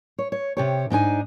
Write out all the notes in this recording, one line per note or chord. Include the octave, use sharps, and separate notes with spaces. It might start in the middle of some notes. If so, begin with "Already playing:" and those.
C#5
C#5
C3 G4 C#5
G#2 D4 D#4 G#5